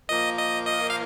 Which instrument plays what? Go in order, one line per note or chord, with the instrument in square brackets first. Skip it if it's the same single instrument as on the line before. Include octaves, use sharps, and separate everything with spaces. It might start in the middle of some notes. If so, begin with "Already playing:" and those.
[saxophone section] A#2 F3 A#3 [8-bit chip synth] D#5
[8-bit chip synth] D#5
D#5
F5